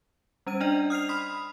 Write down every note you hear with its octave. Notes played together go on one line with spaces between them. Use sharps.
G3 C#4 C5 D#7
D4 D5 D#5 G5
D#6 F6 C7 F7
B5 C6 D#6 B6